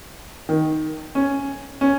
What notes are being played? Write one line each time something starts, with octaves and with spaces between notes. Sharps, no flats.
D#3
C#4
C#4